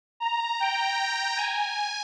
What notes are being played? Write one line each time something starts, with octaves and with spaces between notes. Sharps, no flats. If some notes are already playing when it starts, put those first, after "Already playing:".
A#5
G5
G#5